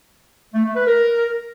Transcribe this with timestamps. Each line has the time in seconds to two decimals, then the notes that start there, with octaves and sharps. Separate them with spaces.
0.54 A3
0.65 A3
0.76 B4
0.87 A#4